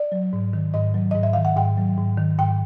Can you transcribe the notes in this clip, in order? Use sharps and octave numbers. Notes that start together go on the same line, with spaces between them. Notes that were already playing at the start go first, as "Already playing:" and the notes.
Already playing: D5
F#3
G#2
D#3
G#2 D#5
F#3
G#2 D#5
E5
D#3 F5
F#5
G#2 G5
F#3
G#2
D#3
G#2 G5